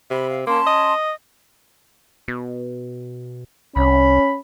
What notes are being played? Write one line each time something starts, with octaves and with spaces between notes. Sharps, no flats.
C3 B5
F5
A#3 C#4 A5 C6
D#5
B2
C2 C#4 B5